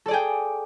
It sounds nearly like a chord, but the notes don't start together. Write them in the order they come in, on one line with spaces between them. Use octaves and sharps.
A4 D5 G#4 G5